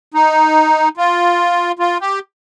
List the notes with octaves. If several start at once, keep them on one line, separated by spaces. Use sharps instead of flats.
D#4
F4
F4
G4